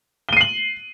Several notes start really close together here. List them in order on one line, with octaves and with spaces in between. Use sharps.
G7 D#7 C7 F#7